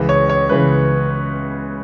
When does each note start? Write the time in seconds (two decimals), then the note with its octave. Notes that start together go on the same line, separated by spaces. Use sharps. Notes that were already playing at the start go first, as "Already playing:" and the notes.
Already playing: C#2 C#3 E3
0.09 C#5
0.29 C#5
0.49 C#2 C#3 E3 B4